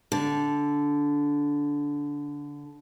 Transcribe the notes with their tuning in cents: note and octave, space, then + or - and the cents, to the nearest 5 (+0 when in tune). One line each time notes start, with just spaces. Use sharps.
D3 -15